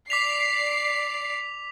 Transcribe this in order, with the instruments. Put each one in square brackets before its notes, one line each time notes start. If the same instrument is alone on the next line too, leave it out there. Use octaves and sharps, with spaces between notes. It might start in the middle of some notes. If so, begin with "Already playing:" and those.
[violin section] D5 C7 [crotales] D6 B6 F7